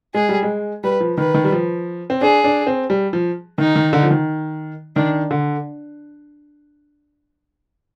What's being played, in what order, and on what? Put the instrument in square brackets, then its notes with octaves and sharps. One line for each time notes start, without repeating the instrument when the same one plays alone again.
[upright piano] G#3 [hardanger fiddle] G#4
[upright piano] G3
G#3
[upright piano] G3 [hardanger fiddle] B4
[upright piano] F3
[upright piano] D#3 [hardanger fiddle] B4
[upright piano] D#3
G3
F3
C4
[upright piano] D4 [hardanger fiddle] G#4
[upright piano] D4
C4
G3
F3
[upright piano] D#3 [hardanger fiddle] D#4
[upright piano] D#3
D3
F3
D#3
[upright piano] D#3 [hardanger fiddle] D4
[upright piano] D3